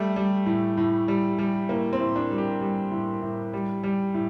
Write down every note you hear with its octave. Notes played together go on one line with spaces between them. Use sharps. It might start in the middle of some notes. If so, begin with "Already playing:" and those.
Already playing: G3 A3
G3
A2
A2
G3
G3
A2 A#3
C4
A2
D4
G3
G4
G3
A2
A2
G3
G3
A2